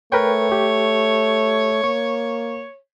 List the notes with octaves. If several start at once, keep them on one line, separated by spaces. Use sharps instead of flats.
A3 A#4 B4 C#5 G5
G4
A#3 C#6